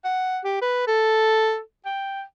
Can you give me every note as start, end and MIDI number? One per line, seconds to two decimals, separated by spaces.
0.04 0.39 78
0.44 0.57 67
0.62 0.83 71
0.87 1.59 69
1.85 2.23 79